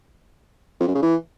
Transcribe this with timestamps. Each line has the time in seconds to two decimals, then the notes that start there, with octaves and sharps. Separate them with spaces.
0.80 F2
0.88 F#2
0.95 C#3
1.02 E3